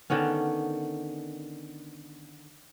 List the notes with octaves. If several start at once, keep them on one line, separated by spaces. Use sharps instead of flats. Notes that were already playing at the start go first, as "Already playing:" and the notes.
D3 D#3 B3 C#4